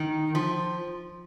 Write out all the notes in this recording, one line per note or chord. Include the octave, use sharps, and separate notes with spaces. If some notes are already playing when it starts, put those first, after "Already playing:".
Already playing: D#3
F3